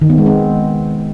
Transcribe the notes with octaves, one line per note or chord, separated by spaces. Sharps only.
D#3
B3
G#3
C4